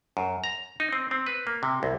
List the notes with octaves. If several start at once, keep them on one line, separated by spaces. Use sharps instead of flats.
F#2
A#5
D#4
C4
C4
B4
A#3
C3
C2